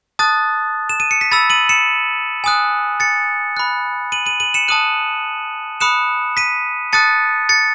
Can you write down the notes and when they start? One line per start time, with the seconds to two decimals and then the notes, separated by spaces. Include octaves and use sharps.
0.19 A5 D#6 F#6 A6
0.89 E7
1.00 D#7
1.11 C#7
1.21 B6
1.32 B5 E6 A6
1.50 D#7 F#7
1.69 C#7 E7
2.44 G#5 D#6 F#6
3.00 A6 C#7
3.57 B5 F#6
4.12 D#7 F#7
4.26 D#7 F#7
4.40 D#7 F#7
4.54 C#7 E7
4.68 A5 D#6 F#6 D#7 F#7
5.80 B5 D#6 F#6 C#7 E7
6.37 B6 D#7
6.93 A5 D#6 F#6 A6 C#7
7.49 A6 C#7